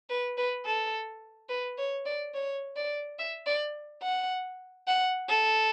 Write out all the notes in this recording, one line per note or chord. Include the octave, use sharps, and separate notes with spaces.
B4
B4
A4
B4
C#5
D5
C#5
D5
E5
D5
F#5
F#5
A4